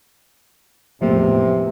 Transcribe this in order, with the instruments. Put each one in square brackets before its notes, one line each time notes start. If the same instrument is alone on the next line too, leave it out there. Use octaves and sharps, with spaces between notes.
[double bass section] A1 E2 A2 [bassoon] C3 [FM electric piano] F3 A3 A#3